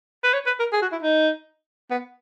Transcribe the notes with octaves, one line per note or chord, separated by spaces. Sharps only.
B4
C#5
B4
A#4
G#4
F#4
E4
D#4
B3